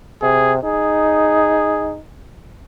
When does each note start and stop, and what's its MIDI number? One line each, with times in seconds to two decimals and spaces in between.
0.22 0.60 48
0.22 0.53 68
0.63 1.98 63
0.63 1.96 68